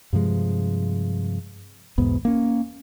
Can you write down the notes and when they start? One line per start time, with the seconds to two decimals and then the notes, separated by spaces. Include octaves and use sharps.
0.13 G2 C3 F3 G#3
1.98 B1 E2 G#2 B3
2.25 A#3 C#4